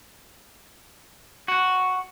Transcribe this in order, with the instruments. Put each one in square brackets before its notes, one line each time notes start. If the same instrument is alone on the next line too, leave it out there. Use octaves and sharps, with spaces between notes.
[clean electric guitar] F#4